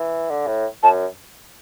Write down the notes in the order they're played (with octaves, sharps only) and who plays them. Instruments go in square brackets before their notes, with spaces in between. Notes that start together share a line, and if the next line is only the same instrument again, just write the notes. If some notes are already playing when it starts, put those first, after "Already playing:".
Already playing: [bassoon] E3
D3
A2
[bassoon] F#2 [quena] A5